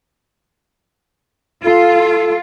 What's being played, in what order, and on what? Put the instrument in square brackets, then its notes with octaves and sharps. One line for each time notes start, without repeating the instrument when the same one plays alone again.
[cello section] F4 [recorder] A4